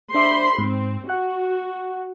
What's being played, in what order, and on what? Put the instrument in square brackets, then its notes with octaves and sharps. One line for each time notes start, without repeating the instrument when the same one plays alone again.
[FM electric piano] D4 E5 D6 [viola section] C5 B5 C6
[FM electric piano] G#2 [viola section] C4
[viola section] F#4 [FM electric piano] F#5 F#6